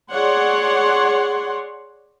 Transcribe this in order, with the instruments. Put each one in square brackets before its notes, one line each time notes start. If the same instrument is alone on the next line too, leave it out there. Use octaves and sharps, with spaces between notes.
[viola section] G#4 C#5 D5 F#5 C6